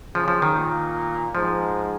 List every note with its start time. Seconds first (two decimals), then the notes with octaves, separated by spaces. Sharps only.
0.15 C#3 F3
0.28 F3
0.42 D#3
0.55 A#2
1.35 G#2 F3